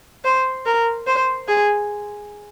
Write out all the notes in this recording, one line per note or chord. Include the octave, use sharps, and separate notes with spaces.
C5
A#4
C5
G#4